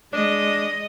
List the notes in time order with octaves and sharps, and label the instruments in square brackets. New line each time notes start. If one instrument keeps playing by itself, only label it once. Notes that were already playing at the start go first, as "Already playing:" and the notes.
[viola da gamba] G#3 D#5 [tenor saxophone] D4